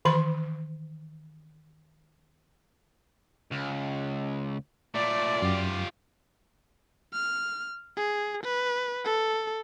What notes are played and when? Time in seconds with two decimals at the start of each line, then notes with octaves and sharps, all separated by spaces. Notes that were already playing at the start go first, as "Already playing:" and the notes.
0.05 D#3 E3 B5 C6
3.51 C#2
4.95 A#2 A3 D5
5.42 F#2 F4 G4
7.13 F6
7.96 G#4
8.43 B4
9.05 A4